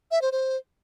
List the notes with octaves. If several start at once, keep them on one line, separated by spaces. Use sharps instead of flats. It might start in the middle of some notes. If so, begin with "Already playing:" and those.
E5
C5
C5